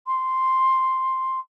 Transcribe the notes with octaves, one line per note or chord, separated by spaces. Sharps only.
C6